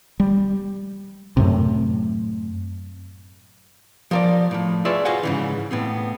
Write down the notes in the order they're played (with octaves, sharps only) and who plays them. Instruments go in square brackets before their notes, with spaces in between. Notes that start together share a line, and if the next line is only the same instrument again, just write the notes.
[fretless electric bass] G3
F#2 A2 C3
[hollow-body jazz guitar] F3 A#4 D5
A2 F3
F4 G#4 B4 C#5 D5 E5
F#4 G#4 C5 F5 F#5 G#5
G#2 C#3 E3
A2 B3 C4